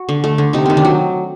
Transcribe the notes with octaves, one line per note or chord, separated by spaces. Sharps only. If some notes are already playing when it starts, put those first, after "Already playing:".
Already playing: F#4
D3
A3
D3
C3 D#4
D#3 C4
D4
F#3